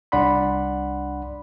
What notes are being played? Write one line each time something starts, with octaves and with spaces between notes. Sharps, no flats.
C2 D4 D5 F#5 B5 C6